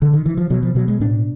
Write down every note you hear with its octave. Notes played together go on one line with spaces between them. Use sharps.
D3
D#3
E3
F3
B2 F#3
F3
B2 F#3
G#3
A2 D4